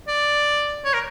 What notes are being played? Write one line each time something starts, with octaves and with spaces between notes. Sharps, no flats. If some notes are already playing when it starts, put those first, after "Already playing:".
D5
C#5
A#4